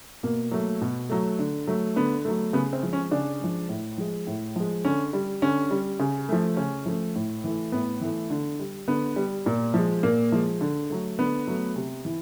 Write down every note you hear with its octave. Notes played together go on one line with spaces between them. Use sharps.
B2 A#3
F#3 A3
B2
F#3 A3
D3
F#3 A3
D3 B3
F#3 A3
C#3 B3
C4
F3 G#3
C#4
C#3 D4
F3 G#3
A2
F3 G#3
A2
F3 G#3
D3 C#4
G3
D3 C#4
G3
C#3
F3 A3
C#3 C#4
F3 A3
A2
E3 A3
A2 B3
E3 A3
D3
G3
D3 B3
G3
A#2
F3 G#3
A#2 A#3
F3 G#3
D3
F#3 A3
D3 B3
F#3 A3
C3
E3